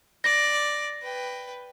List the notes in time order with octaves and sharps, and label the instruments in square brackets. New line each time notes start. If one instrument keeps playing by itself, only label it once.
[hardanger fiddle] D5 [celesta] A#6
[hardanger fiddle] B4 G5